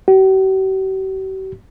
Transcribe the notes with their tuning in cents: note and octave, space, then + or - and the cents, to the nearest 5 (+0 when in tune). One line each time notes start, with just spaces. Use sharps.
G4 -45